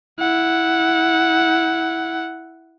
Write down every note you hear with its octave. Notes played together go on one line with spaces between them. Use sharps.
E4 F#5